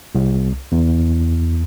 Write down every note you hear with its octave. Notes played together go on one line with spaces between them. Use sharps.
C2
E2